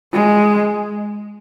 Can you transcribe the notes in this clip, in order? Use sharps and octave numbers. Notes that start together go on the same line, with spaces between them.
G#3